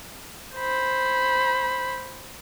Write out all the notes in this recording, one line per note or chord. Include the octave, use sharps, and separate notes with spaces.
C5 B5